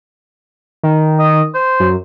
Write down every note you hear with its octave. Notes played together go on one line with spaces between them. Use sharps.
D#3
D#5
C5
F#2